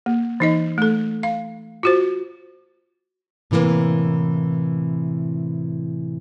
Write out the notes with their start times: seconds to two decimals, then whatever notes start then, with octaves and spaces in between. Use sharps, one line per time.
0.06 A#3
0.40 E3 D#4 D#5
0.78 A3 A4
1.23 F5
1.83 F4 F#4 C5
3.51 A2 C3 E3 G3 A#3